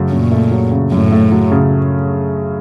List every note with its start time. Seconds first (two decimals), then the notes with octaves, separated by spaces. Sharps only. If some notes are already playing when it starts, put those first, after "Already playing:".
Already playing: F#2 C#3 F#3 A3
0.12 F#2 A#2
0.32 A3
0.51 F#3
0.72 C#3
0.91 F#2 A2
1.12 A3
1.32 F#3
1.52 C#3